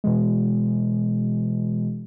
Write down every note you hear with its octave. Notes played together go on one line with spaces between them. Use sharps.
B2 E3 G#3